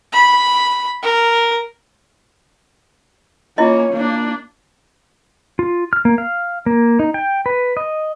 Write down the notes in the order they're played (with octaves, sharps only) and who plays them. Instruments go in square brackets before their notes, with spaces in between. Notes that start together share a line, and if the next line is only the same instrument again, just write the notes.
[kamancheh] B5
A#4
[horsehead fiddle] A#3 C#4 [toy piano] E4 F4 D#5
[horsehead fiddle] A#3 D4
[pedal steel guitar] F4
F6
A#3
F5
A#3
D#4
G5
B4
D#5